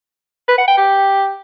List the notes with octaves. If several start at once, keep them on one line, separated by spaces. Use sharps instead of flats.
B4
F#5
G5
G4